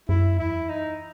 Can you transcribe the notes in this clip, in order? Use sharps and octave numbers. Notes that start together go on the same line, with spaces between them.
F#2 E4
E2 E4
D#4